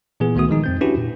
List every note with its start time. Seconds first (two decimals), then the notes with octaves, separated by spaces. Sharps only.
0.20 A#2 E3 B3 G#4
0.35 C#2 D#3 A3 B3 F#4 D#6
0.49 D#3 F3 G#3 D#4
0.64 F2 C4 G6
0.81 C#4 D4 E4 F#4 G4 B4
0.97 A#2